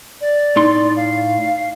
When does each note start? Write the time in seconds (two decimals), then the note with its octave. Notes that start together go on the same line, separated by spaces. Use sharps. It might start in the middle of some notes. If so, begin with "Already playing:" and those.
0.21 D5
0.56 A2 D#4 C6
0.97 F5